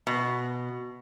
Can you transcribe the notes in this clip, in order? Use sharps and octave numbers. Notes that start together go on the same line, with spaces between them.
B2